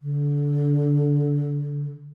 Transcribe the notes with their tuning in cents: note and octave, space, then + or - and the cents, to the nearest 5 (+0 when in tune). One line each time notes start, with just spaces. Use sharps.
D3 -25